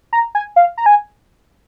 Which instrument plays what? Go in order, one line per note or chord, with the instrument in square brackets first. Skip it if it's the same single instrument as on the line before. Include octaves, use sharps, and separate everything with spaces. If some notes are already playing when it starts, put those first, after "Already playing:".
[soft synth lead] A#5
G#5
F5
A#5
G#5